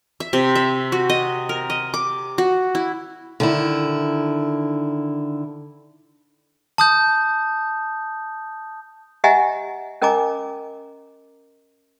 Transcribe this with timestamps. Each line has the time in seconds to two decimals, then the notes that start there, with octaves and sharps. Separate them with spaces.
0.20 E5
0.33 C3
0.55 E5
0.92 F#4
1.10 D#5
1.49 A#4
1.70 D#5
1.94 D6
2.38 F#4
2.75 E4
3.40 D3 D#3 E4
6.78 A5 D#6 G6
9.24 G4 D#5 E5 F#5 G#5 A#5
10.02 C#4 A#4 D#5 G#5 A#5 D6